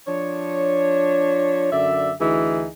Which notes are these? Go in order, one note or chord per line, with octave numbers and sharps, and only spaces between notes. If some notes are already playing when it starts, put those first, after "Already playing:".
F3 D4 C#5
F#2 D3 D5 E5
D2 E3 D#4 G#4